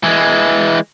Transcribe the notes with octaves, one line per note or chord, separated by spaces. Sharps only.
E3 G#3